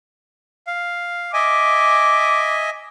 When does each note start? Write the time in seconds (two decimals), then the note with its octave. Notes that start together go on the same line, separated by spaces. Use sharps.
0.67 F5
1.34 D#5 E5 G#5 D6